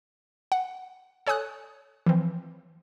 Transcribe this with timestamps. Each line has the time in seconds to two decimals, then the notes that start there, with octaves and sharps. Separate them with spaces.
0.52 F#5
1.27 A4 C#5 G#5 D#6 F#6
2.06 E3 F3 C4